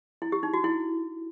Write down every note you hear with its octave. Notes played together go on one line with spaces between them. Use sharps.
E4
G4
D#4
F#4
E4